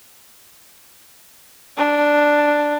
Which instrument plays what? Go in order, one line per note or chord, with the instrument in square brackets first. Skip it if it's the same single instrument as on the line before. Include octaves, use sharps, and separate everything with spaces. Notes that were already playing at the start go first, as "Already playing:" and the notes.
[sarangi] D4